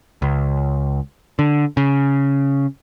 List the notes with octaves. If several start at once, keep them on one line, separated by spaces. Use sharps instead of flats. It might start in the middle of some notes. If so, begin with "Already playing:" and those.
C#2
D3
C#3